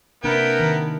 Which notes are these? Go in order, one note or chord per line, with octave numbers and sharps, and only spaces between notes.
C3 A#3 B3 D4 E4 A#4 G5
D#3